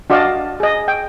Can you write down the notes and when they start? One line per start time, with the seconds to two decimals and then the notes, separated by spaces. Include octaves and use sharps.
0.10 D4 F#4 D5 D#5 F5 A5
0.60 G#4 D#5
0.88 G5